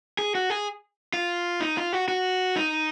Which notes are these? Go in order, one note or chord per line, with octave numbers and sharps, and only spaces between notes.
G#4
F#4
G#4
F4
D#4
F4
F#4
F#4
D#4